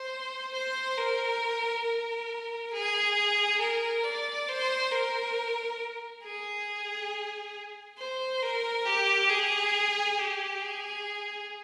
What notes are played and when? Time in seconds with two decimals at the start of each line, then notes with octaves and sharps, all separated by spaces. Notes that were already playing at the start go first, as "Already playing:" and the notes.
Already playing: C5
0.53 C5
0.97 A#4
1.84 A#4
2.72 G#4
3.59 A#4
4.04 D5
4.48 C5
4.91 A#4
6.22 G#4
7.98 C5
8.42 A#4
8.85 G4
9.29 G#4
10.17 G4
10.61 G#4